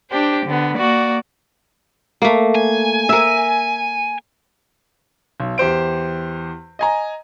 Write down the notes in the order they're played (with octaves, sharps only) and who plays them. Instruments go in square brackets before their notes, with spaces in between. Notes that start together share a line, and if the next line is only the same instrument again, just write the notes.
[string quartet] D4 G4 C5
D3 B3
A#3 F#4 D5
[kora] A3 A#3
[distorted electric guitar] G#5
[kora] A#4 E5
[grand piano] B1
E2 G4 C5 D7
D#5 G#5 A#5